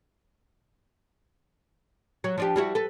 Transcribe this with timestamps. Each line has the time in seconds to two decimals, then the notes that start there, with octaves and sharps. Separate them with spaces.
2.24 F#3
2.38 F3 D4 G4
2.56 G3 E4 F#4
2.75 A4 B4